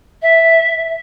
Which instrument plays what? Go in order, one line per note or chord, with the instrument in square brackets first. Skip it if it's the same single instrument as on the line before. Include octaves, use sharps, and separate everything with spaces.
[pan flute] E5